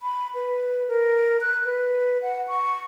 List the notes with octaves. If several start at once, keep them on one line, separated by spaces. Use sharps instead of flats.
B5
B4
A#4
F#6
B4
F#5
C#6